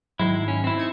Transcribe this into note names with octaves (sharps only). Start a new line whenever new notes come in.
G#2 D#3 F#3 G#3 E4
C#4
C4 E4
D#4 G#6 C#7